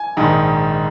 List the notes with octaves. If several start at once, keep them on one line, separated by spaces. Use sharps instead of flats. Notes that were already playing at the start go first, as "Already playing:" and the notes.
Already playing: G#5
A#1 G#2 D#3